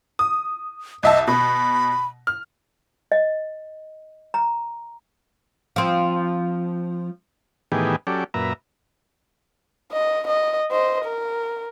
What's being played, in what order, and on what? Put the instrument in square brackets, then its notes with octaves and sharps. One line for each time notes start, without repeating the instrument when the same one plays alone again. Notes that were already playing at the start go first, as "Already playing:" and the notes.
[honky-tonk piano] D#6
[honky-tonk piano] C2 E5 A5 [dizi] D#5
[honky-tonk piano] B2 [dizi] B5
[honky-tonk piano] F6
[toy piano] D#5
A#5
[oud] F3 C4
[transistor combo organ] A2 D#3 E3 B3 G4 G#4
F#3 C#4 G4 A4 D5
F#2 A#2 B4 E5 A#5
[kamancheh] D#5
D#5
C5 D#5
A#4